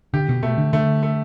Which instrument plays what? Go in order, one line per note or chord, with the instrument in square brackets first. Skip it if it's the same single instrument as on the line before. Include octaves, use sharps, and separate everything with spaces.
[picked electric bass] D3 [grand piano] G4
[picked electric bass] B2
[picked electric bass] B2 [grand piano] A3
[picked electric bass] D3
[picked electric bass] D3 [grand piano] A3
[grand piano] A3